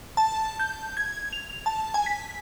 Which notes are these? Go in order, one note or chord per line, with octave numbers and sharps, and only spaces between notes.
A5
G6
G#6
F7
A5
G#5
B6